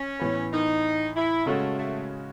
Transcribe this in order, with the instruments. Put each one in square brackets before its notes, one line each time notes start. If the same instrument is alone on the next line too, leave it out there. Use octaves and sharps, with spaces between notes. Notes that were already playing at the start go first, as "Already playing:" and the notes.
Already playing: [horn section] C#4
[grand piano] A2 E3 B3
[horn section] D#4
E4
[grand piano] C#3 G#3 C#4 F#4 [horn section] A3
[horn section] A3